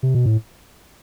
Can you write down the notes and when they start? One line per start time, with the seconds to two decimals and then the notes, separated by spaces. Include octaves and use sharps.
0.03 C3
0.15 B2
0.26 A2